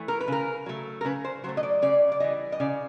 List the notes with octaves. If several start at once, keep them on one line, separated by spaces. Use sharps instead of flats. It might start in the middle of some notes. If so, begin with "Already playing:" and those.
Already playing: E3 A3
A#4
B4
C#3 A#4
F#3 A3
A#4
C#3 B4
C5
F#3 A3 C5
D#5
D5
C#3 D5
D5
E3 G3 D#5
D#5
C#3 D5